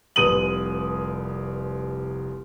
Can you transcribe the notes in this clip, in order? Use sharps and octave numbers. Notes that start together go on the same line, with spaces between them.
F1 C2 B4 D#6 D#7 F#7